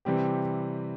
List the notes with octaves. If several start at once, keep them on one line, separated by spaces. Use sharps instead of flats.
C3 E3 G3 C4 G4